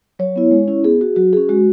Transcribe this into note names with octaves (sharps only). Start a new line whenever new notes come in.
F#3 C#5
B3 E4
G#3
C#4 E4
B3 G#4
F#4
F#3 F#4
C#4 F#4 G#4
G#3 F#4